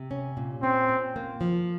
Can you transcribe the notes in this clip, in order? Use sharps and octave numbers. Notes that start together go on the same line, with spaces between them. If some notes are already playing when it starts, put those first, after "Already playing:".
Already playing: C3
C#4
A#2
C4 C#4
A#2
A#3
F3